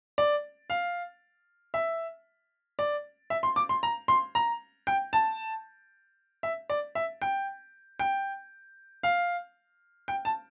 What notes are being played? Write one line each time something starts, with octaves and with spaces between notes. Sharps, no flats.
D5
F5
E5
D5
E5
C6
D6
C6
A#5
C6
A#5
G5
A5
E5
D5
E5
G5
G5
F5
G5
A5